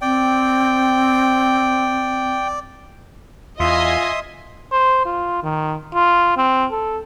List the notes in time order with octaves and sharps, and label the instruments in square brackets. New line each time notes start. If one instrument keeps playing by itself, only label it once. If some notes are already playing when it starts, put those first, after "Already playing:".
[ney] C4 [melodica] D5 [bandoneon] G5
[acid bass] E2 [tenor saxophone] F4 [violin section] D#5 G#5 [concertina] E5 C6 D#6
[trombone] C5
F4
D#3
F4
C4
A4